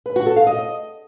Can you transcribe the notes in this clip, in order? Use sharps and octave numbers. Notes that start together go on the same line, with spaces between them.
B4
F#4
A4
F5
D#5